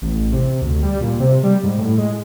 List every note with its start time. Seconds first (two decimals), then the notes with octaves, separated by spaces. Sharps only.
0.02 A1
0.33 C3
0.62 D2
0.83 G3
1.01 A#2
1.19 C3
1.43 G3
1.64 G#2
1.78 A2
1.98 G#3